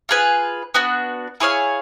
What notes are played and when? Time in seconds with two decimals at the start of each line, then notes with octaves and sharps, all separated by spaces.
0.09 F4 G#4 B4
0.74 B3 D4 F#4
1.40 E4 G#4 C#5 F5